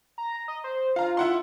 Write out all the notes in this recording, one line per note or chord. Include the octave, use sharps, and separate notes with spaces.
A#5
D#5
C5
F4 F5 A#5
E4 F#5 C6